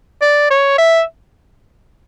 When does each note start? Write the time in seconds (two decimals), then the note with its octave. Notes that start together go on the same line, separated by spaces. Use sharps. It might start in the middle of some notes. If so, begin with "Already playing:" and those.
0.21 D5
0.50 C#5
0.78 E5